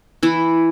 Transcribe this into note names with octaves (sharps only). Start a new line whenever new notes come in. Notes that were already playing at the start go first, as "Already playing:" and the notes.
E3 E4